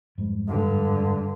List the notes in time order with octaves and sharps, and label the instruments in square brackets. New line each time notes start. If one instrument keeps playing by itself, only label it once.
[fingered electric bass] F2 G#2 G3
[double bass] G2 D3